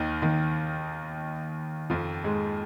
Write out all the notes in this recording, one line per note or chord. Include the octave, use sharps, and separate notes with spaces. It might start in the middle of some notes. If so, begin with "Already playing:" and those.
Already playing: D#2 D#3
D#2 D#3
F2 F3
G#2 G#3